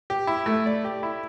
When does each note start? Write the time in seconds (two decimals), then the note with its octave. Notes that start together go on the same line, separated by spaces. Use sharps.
0.10 G4
0.27 E4
0.46 A3
0.66 D5
0.85 G4
1.03 E4